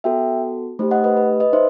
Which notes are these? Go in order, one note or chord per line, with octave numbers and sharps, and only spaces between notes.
B3 F#4 A4 E5 G5
A3 D#4 G4 C5
D#5 F#5
B4 D#5
B4
B4 D#5
D#4 C5 E5